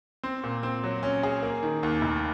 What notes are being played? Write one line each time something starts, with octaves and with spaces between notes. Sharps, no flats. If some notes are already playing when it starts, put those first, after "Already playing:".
C4
A#2
C4
F#3
C#4
G#4
A#3
D#3
D#2
F1